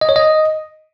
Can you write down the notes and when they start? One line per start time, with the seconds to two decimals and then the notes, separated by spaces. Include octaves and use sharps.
0.01 D#5
0.09 C#5
0.16 D#5